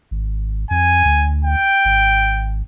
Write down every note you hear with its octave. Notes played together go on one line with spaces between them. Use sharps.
G#1
F2 G#5
D2
G5
G#1